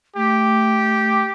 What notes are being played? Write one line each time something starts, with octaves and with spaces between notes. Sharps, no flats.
A3 G4